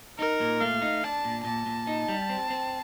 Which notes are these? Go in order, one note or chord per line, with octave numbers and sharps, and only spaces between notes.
D#4 A#4
A#2
A3 F5
D#4
D4 A5
A#2
A#2 A5
A#2
D#4
G3
C4
C4